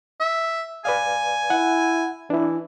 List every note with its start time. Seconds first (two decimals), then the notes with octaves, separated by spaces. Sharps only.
0.20 E5
0.85 B4 D5 F5 G#5
1.50 E4 F#5
2.30 E3 D4 E4